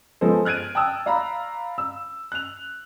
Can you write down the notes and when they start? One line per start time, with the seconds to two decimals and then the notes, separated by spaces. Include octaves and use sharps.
0.21 F3 G#3 B3 A4 C5
0.45 F6 F#6 G#6 D7 D#7
0.75 G5 A5 D#6 E6
1.06 D5 F5 A#5 B5
1.78 E6
2.32 F#6 F7